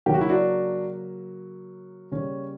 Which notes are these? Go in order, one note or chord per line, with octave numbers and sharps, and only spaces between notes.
C#3 F#3 A#3 G4
F#4
E4
D4 F#4
C#3 G3 A#3 C#4